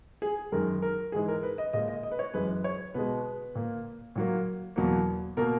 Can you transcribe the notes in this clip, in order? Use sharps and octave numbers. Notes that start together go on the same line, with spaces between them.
G#4
F#2 D#3 G#3 A#4
A#4
G#2 E3 G#3 G#4
A#4
B4
D#5
A#2 G#3 D#5
D#5
D#5
B4
C#5
F#2 E3 G#3 B4
C#5
B2 G#3 B4
A#2 A#3
A#2 F#3 A#3
E2 B2 F#3 A#3
B2 A#3 A#4